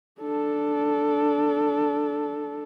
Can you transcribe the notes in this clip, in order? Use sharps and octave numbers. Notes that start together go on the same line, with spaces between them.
D4 A4